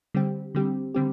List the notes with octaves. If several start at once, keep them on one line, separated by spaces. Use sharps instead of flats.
D3 G3 C4 G4
D3 G3 C4 G4
D3 G3 C4 G4